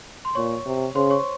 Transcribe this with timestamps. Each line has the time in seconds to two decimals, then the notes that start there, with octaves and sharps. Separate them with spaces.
0.25 C6
0.35 A#2 C#5 C#6
0.65 C3
0.95 C#3 C5 C6
1.10 C#5 C#6